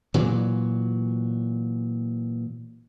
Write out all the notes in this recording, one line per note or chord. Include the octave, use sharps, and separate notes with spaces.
A#2 E3 F#3